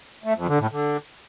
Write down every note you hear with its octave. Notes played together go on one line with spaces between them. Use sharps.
A3
F2
D3
A2
D3